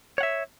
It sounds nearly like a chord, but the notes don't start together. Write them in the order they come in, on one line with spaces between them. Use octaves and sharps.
C#5 F#5 E5